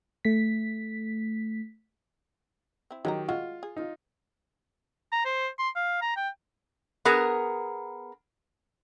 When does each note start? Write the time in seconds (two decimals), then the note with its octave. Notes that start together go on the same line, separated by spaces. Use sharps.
0.25 A3 B6
2.91 C4 E4
3.05 D#3 F#3 G#3 G4 A#4 A#5
3.29 G#3 F4 F#4
3.63 G#4
3.76 D#4 F4
5.12 A#5
5.25 C5
5.59 C6
5.75 F5
6.02 A#5
6.16 G5
7.05 B3 G#4 A#4